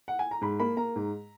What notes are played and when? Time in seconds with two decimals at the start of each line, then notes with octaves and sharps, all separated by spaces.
0.08 F#5
0.19 G#5
0.31 A#5
0.41 G#2 B5
0.60 A#3 B5
0.77 A#3 A#5
0.96 G#2